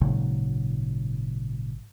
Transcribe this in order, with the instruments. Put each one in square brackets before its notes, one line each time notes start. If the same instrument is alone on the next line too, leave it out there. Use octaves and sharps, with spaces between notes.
[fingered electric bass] G#1 A#2 C#3 F#3